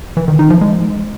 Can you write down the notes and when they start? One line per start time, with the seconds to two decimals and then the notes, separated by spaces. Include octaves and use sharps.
0.17 E3
0.28 D#3
0.39 D#4
0.50 F3
0.61 G#3